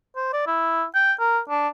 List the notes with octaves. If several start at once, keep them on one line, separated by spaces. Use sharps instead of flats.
C5
D5
E4
G5
A#4
D4